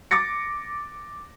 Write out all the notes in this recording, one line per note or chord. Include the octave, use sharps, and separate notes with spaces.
D6 A6 A#6 C#7